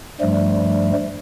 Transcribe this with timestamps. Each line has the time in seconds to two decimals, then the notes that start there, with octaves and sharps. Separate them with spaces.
0.21 G2 F3 G3 A3